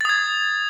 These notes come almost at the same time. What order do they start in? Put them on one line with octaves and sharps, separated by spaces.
A6 D#6 G#6